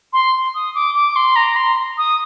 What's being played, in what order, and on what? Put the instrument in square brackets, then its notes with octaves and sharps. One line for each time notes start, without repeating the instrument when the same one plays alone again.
[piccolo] C6
D#6
D6
D6
C6
A#5
C6
D#6